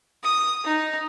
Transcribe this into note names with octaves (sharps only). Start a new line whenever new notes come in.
D#6
D#4